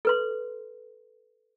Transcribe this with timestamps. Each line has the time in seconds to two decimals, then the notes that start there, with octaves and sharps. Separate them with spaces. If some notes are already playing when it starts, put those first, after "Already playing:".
0.05 A4 B4 C6